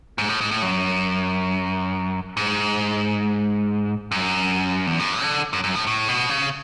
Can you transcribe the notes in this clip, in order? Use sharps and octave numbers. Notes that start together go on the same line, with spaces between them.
G#2
A2
G#2
A2
F#2
G#2
F#2
E2
F#2
D3
F#2
F#2
A2
A2
B2
C#3